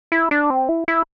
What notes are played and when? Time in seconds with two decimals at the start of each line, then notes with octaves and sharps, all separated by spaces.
0.12 E4
0.31 D4
0.50 C4
0.69 E4
0.88 E4